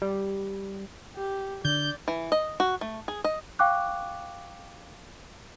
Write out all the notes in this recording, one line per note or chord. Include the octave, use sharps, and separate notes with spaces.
G3
G4
D3 D5 G6
E3
D#5
F#4
A3
G#4
D#5
F5 G5 C#6 D6 F#6